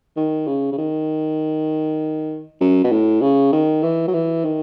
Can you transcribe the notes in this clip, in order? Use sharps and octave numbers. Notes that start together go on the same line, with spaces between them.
D#3
C#3
C#3
D#3
F#2
B2
A2
C#3
D#3
E3
F#3
E3
D#3